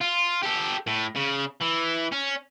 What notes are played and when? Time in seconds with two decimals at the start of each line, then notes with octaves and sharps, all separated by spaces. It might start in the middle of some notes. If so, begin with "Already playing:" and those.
0.01 F4
0.43 G4 A4
0.87 A2
1.16 C#3
1.62 E3
2.13 C#4